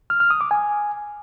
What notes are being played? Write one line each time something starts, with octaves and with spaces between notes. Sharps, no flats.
F6
F6
D#6
D6
G#5